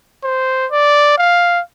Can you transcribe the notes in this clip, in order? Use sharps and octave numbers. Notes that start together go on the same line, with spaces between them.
C5
D5
F5